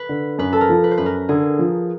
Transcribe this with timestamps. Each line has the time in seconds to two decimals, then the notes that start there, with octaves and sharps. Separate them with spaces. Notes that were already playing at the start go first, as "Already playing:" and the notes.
Already playing: B4
0.09 D3
0.38 F#2 B4
0.53 A4
0.61 A#4
0.69 F3
0.84 B4
0.91 C5
0.98 F#2 B4
1.06 A#4
1.29 D3 G#4
1.59 F3